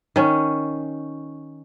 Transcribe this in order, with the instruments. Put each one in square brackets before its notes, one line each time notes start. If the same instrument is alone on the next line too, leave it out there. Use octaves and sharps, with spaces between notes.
[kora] D#3 C#4